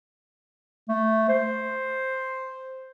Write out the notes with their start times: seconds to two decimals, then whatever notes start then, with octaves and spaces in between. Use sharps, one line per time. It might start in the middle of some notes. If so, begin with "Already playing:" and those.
0.89 A3
1.29 C5